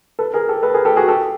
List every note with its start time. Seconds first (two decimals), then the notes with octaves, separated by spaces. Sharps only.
0.19 A4 B4
0.34 G#4 A#4
0.48 G4 A4
0.63 A4 B4
0.74 G#4 A#4
0.85 G4 A4
0.96 F#4 G#4
1.08 G4 A4